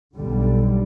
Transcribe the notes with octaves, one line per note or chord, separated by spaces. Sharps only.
B1 D3 G3